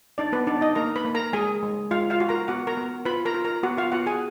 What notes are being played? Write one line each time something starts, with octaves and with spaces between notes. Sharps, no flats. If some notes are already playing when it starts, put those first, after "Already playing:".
D4 D#4 D5
B3 B4
D4 D#4 D5
D#4 D#5
A#3 A#4 A#5
B4 B5
A#3
A#4 A#5
G#3 G#4 G#5
G#3
G#3 F4 F5
F4 F5
F#4
A#4 A#5
B3 F#4 F#5
A#4 A#5
B3
F4 B4 B5
A#4 A#5
F4
A#4 A#5
B3 F#4 F#5
F4 F5
B3 F#4 F#5
G#4 G#5